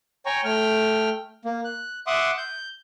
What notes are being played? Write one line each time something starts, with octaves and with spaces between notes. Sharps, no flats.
C#5 G5 G#5 A#5 C#6
A3 G5 F6
A#3
F#6
E5 F#5 C6 D6 D#6 F#6
G6